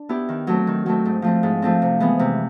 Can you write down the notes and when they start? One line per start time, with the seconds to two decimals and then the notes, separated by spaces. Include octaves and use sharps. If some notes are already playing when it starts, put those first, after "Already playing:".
Already playing: D4
0.09 B3 E4 G4
0.29 D#3
0.47 F#3 A3 C4
0.67 D#3
0.86 F#3 A3 C4
1.05 G#2
1.22 F3 A3 C4
1.43 G#2
1.62 F3 A3 C4
1.82 C3
2.00 E3 G#3 B3
2.19 C3